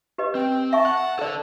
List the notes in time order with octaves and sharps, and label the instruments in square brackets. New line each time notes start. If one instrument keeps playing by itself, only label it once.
[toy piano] G4 B4 D#5
[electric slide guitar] C4 [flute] G5
[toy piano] E5 G#5 C#6 [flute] A5
[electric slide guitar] F#5
[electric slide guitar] D4 A4 [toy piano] A#4 D5